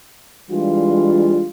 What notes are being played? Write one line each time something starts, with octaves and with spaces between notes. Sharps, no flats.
E3 G3 G#3 D4 F4